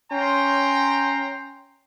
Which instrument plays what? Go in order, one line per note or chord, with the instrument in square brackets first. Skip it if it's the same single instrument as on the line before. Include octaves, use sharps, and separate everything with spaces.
[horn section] C#4 G5 A#5 C6